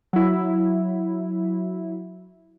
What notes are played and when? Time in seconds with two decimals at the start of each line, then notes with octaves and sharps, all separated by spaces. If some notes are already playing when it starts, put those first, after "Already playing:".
0.13 F#3 E4